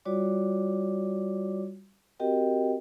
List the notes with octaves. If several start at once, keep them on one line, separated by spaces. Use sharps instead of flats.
G3 F4 F#4 C#5 D5 D6
C4 F#4 G4 A#4 D#5 G5